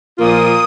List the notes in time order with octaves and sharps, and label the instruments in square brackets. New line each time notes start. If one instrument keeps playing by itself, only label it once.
[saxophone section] A#2 F3 A#3 F4 [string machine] D#6